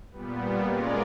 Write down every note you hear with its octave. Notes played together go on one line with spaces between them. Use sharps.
A#2 G3 B3
G#3 C#4 F4 A#4 D5